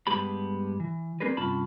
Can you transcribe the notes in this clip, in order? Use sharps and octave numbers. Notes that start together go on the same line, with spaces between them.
G2 G#3 B3 G4 A5 B5
E3
A#3 C4 D4 G#4 A#4 B4
G2 C3 C#4 F4 A5 B5